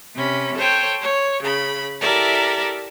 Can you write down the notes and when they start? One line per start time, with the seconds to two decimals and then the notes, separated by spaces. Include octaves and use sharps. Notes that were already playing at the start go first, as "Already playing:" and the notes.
0.16 C3 C#4 B5
0.55 A4 C5 C#5 G5
1.00 C#5
1.42 C#3 B5
2.01 E4 G4 A4 A#4 D5 E5